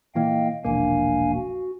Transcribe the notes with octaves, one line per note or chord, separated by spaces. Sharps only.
A#2 E3 A#3 D#5 F5 G5
E1 A#1 A#3 D4 F5 G#5
F#4